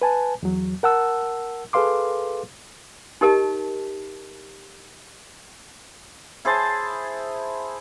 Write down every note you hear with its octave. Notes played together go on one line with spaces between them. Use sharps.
B4 G#5 A5
E2 F#3
A#4 F#5 A5 E6
G#4 A4 B4 F5 C6 D6
D#4 G4 A#4 D#5 A5
E4 G#4 C5 A5